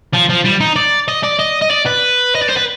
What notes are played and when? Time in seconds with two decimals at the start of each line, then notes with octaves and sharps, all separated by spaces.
0.14 F3
0.30 F3
0.45 G3
0.60 D#4
0.76 D5
1.08 D#5
1.23 D5
1.39 D#5
1.61 D#5
1.70 D5
1.86 B4
2.35 D#5
2.42 D5
2.49 C5
2.57 B4